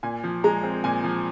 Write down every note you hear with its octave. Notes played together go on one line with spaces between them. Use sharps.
A#2 G#5
F3
G#3 A#5
C4
A#2 G#5
F3